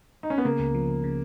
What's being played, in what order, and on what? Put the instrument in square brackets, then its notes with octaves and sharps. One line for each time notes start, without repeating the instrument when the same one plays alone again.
[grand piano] D#4
C#4
B3
[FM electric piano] C#3 [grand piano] A#3
[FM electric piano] C#2
F3
C#2
C#3